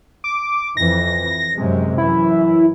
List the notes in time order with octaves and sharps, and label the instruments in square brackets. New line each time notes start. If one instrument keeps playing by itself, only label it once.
[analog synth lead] D6
[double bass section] F2 E3 [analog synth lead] A#6
[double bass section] F#2 C3 G#3
[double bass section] F#2 E3 [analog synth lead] E4